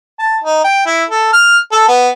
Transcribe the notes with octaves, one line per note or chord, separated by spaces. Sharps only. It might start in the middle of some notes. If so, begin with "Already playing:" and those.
A5
D#4
G5
E4
A4
F6
A4
B3